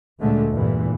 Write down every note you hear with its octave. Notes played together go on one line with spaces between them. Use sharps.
D2 A#2 D3 G#3 A3
E2 G2 A#2 E3